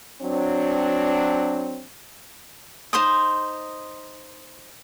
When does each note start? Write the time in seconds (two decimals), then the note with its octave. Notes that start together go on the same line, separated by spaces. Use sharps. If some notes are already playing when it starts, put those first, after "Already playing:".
0.22 F#3 C4 D4
2.93 D#4 C5 C6 D#6